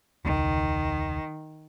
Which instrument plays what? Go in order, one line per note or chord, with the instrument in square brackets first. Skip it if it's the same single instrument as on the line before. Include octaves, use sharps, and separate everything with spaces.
[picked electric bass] E1 C#2 [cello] D#3